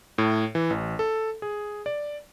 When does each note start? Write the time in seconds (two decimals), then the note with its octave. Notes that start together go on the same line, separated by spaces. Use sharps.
0.18 A2
0.55 E3
0.70 A1
0.99 A4
1.42 G#4
1.86 D5